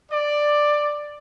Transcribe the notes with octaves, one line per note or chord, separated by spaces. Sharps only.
D5